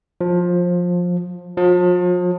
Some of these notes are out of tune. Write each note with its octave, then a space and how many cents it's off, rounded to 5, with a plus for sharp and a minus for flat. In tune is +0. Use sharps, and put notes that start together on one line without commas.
F3 +20
F3 +40